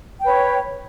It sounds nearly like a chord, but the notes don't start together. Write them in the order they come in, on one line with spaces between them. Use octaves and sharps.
G5 B4 C#5